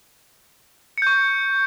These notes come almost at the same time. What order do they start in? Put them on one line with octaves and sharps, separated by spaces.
C#7 G6 C#6